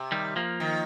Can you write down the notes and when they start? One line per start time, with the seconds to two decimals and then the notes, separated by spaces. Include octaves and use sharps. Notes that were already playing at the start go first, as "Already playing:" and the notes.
Already playing: C3
0.12 D#3 G3
0.36 F3 A#3
0.60 D#3